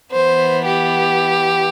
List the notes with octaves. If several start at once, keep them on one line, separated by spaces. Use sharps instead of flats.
E3 B3 C5
G4